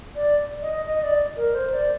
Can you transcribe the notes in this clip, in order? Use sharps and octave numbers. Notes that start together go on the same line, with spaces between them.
D5
D#5
D#5
D5
A#4
C5
D5